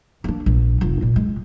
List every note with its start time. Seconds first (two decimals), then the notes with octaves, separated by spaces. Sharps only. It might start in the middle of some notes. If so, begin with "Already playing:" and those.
0.24 A#3 D4
0.46 A#1
0.81 F1 F4
1.02 A#2
1.16 G#3